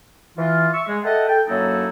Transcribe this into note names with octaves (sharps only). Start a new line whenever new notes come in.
E3 F4
E5 C#6 E6
G#3
A4 D#5 E5 F#5 G5 A5
A4 G5
F#2 F#3 A#3 D#4 E4 A4